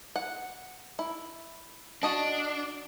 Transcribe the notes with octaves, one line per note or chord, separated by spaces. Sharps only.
F#5
E4
D4 F#4 D#5 A5